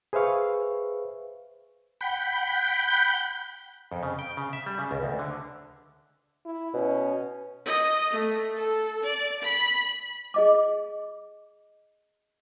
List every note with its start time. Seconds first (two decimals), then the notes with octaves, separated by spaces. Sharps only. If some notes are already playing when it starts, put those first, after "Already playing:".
0.13 G#4 B4 C5 E5 F5 C#6
2.01 F#5 G5 B5 G6
3.92 F2
4.03 C#3
4.19 G5
4.37 C#3
4.53 E5
4.66 G3
4.78 C#3
4.91 C#2
5.03 D2
5.19 D3
6.45 E4
6.74 B2 C#4
7.65 D#5
8.11 A3
8.56 A4
9.03 D5
9.43 B5
10.34 G#4 D#5 D6